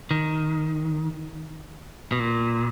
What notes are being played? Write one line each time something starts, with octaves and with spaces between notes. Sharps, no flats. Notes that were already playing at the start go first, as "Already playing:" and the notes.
D#3
B2
A#2